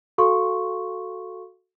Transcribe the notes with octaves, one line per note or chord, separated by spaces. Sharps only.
F#4 A4 F5 C6 C#6